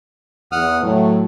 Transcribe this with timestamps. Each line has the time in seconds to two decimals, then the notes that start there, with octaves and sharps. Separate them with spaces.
0.52 E2 F#5 D#6 F6
0.82 A2 F#3 A3